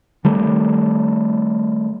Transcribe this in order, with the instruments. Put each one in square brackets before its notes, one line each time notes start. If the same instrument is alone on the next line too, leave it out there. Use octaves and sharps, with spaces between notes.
[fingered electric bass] D#3 G3 A3